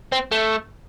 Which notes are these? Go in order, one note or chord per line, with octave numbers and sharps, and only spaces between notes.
C4
A3